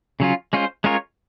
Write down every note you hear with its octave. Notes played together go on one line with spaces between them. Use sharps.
C#3 F#3 C#4 F4
G#3 C#4 F4 C5
G#3 C#4 F4 A#4 C#5